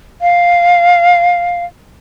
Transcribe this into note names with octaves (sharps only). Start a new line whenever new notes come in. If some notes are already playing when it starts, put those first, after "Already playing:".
F5